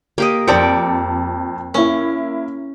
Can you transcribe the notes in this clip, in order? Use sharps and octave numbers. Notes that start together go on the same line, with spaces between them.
A#3 G4 D#5
F2 C4 A#4 D5 A5 C#7
A#3 C#4 E4